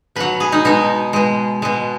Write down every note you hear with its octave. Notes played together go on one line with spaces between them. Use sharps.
B2 F#3 B4
G#4
D#4
B2 G#3 D#4
B2 G#3
B2 G#3